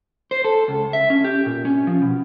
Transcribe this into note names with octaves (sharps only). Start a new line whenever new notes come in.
C5
A4
C#2
E5
C#4
G4
A#2
C#4
F3
B2